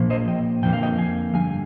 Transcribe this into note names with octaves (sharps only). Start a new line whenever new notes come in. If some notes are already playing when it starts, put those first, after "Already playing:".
Already playing: A#2 F3 A#3
C5 D#5
D#5 G5
F2 D3 F3 A#3 G5
F5
D#5 G5
F5 G#5
G2 D3 G#3 F5 G#5